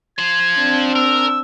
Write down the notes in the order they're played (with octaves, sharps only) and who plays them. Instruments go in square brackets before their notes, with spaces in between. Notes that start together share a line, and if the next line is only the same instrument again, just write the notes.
[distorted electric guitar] F4 C5 [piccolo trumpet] G#6
[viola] C4 D4
[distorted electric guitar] A#4 [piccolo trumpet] E6